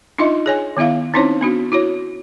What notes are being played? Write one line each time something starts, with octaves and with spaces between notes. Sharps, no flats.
D4 D#4 F4 D#5 E5 C6
G#4 C#5 G#5
D#3 B3 E4 E5 F5
C4 C#4 D#4 E4 C5 C#5
B3 D4 F#4
E4 F#4 C#5